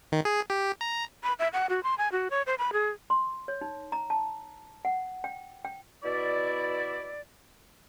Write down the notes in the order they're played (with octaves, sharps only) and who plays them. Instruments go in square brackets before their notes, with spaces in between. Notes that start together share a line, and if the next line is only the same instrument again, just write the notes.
[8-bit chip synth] D#3
G#4
G4
A#5
[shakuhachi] B5
E5
F#5
F#4
C6
G#5
F#4
C#5
C5
B5
G#4
[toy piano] C6
C#5
D#4
A#5
A5
F#5
G5
G5
[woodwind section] B2 E4 D5